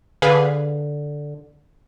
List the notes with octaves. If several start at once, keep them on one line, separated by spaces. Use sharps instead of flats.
D3 G#4 B4 F5